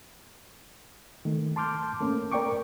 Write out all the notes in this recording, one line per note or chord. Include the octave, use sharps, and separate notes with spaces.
D#3 A3
A5 C6 D6 F6 G6
A3 A#3 C#4
A#4 D5 G5 C#6 D6